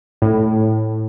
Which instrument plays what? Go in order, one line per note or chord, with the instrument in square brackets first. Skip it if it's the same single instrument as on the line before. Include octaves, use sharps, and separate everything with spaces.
[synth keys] A2